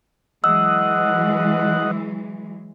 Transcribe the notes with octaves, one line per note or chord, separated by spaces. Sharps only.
E3 F#3 G#3 D#5 F#5 E6